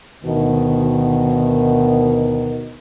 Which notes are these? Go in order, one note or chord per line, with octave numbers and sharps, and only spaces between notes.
D2 B2 D#3